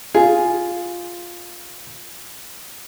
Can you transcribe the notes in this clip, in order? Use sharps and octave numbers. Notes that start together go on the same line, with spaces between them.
F4 G#4